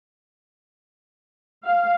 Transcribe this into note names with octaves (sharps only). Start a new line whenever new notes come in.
F5